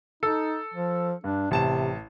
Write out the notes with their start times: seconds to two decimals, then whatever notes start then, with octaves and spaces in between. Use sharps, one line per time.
0.23 D#4 A4
0.74 F3
1.24 G2 D4
1.51 A1 C3 A5 E7